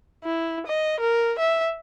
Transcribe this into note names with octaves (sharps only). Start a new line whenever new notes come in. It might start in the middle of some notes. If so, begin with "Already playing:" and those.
E4
D#5
A#4
E5